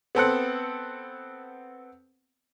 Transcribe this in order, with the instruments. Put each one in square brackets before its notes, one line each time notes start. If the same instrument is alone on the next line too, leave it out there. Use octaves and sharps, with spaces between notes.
[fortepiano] B3 C4 A4 F#5